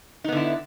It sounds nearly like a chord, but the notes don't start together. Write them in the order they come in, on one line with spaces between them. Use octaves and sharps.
D#4 B3 D3 E4